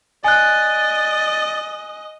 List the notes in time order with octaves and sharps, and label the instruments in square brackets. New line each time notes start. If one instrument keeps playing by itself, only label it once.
[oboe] D5 [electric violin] D#5 [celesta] G#5 F#6